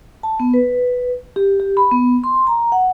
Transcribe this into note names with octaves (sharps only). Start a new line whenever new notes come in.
A5
B3
B4
G4
G4
B5
B3
C6
A#5
F#5